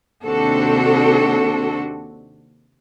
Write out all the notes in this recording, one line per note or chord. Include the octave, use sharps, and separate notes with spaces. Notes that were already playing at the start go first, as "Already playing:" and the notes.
D#2 C3 C4 D4 F#4 A4